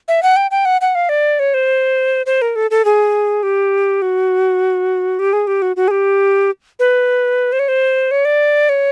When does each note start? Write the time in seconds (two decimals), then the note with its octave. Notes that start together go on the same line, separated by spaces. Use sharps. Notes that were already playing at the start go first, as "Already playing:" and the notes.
0.08 E5
0.23 F#5
0.36 G5
0.51 G5
0.65 F#5
0.81 F#5
0.95 F5
1.09 D5
1.39 C#5
1.54 C5
2.26 C5
2.42 A#4
2.56 A4
2.71 A4
2.85 G#4
3.43 G4
4.02 F#4
5.19 G4
5.33 G#4
5.47 G4
5.62 F#4
5.76 F#4
5.88 G#4
5.91 G4
6.79 B4
7.52 C5
7.59 C#5
7.68 C5
8.11 C#5
8.25 D5
8.69 C#5